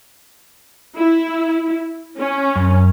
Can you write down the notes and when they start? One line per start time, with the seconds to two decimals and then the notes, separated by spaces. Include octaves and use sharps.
0.96 E4
2.20 C#4
2.56 F#2